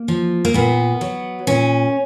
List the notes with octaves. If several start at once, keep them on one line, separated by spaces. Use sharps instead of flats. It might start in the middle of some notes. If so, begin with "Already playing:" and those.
Already playing: A#3
F3
A#3
A#2 B3
F#3
A#2 C#4